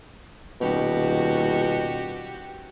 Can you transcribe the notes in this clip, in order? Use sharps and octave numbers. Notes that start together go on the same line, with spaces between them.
D#1 B2 F#4 G4